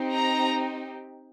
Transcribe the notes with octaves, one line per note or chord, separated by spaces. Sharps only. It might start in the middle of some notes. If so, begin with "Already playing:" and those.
Already playing: C4 D#4 G4
A#5